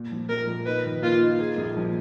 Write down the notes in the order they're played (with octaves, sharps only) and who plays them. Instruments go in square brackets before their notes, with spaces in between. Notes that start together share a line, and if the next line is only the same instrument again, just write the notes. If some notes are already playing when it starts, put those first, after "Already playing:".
Already playing: [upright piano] A#2
F3
[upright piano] A#1 [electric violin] A#4
[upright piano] A#1
[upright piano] D#4 [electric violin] B4
[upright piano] D#3
[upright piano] A#3 [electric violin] F4
[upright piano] D#4
[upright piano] A#3 [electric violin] G#4
[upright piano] A#1
F3